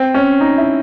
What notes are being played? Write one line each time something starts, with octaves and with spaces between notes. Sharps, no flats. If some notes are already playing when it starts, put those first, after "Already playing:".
Already playing: C4
C#4
D#4
E4